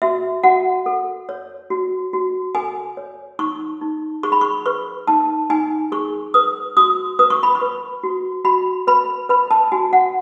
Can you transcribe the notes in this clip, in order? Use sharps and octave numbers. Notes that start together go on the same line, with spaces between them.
F#4 E5
F#4 F#5
A4
C#5
F#4
F#4
A4 G#5
C#5
D#4 C#6
D#4
G#4 C#6
B5
C#6
B4 C#6
D#4 A5
D#4 G#5
G#4 C#6
B4 D#6
F#4 D#6
B4 D#6
C#6
B5
C#6
B4
F#4
F#4 B5
B4 B5
B4 B5
A5
F#4 G#5
F#5